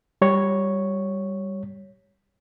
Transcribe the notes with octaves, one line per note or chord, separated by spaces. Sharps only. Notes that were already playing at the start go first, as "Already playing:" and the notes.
G3 C#5